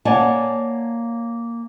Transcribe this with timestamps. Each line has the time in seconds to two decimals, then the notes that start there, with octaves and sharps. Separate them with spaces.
0.05 A#3 C#5 D5 F#5 G#5 A5